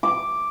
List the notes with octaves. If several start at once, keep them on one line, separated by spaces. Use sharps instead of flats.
D6